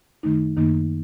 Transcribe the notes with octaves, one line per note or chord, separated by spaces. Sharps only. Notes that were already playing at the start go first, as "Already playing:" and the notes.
F#2 D#3 A3 D#4
F#2 D#3 A#3 D#4